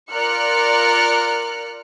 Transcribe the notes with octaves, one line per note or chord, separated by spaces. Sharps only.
F4 A#4 D5 F6 F#6 C#7